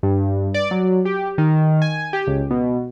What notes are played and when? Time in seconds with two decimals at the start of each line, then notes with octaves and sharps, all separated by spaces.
0.03 G2
0.54 D5
0.71 F#3
1.05 G4
1.38 D#3
1.82 G#5
2.13 G4
2.27 C#2
2.50 B2